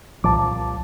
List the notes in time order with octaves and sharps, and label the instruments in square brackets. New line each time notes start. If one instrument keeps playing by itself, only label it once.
[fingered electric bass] C2 A#2 F3 [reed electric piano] A5 D6